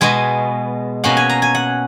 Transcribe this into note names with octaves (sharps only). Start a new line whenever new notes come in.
B2 G#3 B3 G#5
B2 A#3 C#4 F#5
G#5
A#5
G#5
F#5